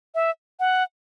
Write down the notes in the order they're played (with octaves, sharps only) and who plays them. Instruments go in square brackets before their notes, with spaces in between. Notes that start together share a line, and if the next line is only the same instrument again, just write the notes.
[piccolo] E5
F#5